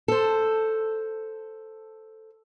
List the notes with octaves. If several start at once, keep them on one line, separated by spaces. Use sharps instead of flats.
A4 C5